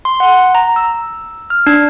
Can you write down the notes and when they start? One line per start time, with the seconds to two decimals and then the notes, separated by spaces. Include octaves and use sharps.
0.05 C6
0.20 F#5
0.55 A#5
0.76 E6
1.50 F6
1.67 D4